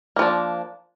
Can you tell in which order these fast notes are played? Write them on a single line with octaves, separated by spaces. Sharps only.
A#3 F3 D4